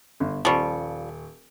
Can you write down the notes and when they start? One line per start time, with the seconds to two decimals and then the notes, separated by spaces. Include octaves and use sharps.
0.20 G1
0.45 D#1 F3 G3 C#6 D7